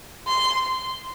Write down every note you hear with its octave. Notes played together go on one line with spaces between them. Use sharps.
C6